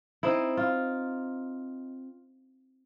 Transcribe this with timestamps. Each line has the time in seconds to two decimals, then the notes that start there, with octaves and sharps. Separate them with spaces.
0.23 C4 D#4 E4
0.57 F4